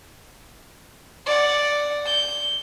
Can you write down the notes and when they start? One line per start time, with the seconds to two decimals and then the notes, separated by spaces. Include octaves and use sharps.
1.26 D5 F#5
2.06 G6